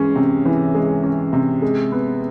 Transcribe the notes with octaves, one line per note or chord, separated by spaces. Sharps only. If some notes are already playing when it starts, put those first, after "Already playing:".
Already playing: E3 G#3 C#4
C3
E3
G#3
C#4
C3
G#3
B3